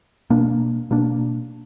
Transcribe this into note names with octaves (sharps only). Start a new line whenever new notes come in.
B2 A#3 D4
B2 A#3 D4